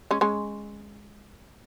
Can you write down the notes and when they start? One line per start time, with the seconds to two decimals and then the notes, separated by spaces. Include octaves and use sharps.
0.11 G#3 C#4
0.21 G#3 C#4